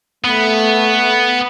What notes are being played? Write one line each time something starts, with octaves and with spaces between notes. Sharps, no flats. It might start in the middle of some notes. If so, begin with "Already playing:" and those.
A3 B3